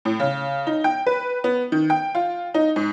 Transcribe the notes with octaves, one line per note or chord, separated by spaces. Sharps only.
A2
C#3
D#4
G5
B4
B3
D#3
G5
F4
D#4
G#2